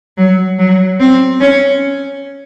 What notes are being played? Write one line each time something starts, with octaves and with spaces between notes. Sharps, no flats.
F#3
F#3
C4
C#4